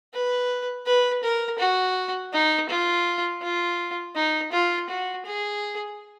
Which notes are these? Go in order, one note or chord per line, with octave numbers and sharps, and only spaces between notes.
B4
B4
A#4
F#4
D#4
F4
F4
D#4
F4
F#4
G#4